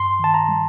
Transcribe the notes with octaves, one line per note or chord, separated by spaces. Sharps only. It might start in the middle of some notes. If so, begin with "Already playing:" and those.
Already playing: G2 C6
D#3 A5
A#5
G3